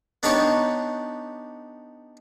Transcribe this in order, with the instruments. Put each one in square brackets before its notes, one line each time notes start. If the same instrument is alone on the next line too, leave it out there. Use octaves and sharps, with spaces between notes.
[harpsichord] B3 D4 D#4 G4 B4 C#5